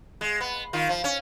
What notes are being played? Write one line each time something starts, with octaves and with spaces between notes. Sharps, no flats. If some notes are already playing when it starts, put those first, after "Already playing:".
G#3
B3
D#3 F4
F3
C#4